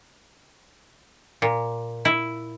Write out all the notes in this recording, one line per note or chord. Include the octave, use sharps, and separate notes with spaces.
A#2
E4